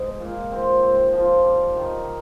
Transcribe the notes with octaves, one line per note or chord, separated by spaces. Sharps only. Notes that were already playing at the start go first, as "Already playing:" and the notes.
Already playing: G#2
A#2
C4
C4
F3
G3
D#3